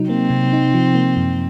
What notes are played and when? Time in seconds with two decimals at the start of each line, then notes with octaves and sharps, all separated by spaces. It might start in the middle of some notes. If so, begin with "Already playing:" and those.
Already playing: C3 F#3 D#4
0.09 A#3 C4
0.30 C3
0.53 D#4
0.74 F3
0.95 A#3
1.17 F#2